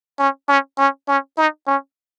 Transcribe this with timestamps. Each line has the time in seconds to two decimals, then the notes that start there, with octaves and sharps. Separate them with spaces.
0.19 C#4
0.49 C#4
0.78 C#4
1.08 C#4
1.38 D#4
1.67 C#4